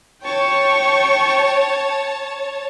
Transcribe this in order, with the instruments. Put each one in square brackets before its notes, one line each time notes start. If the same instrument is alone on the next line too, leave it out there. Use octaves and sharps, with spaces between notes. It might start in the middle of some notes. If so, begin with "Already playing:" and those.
[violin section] C#5 A5 [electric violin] G5 C#6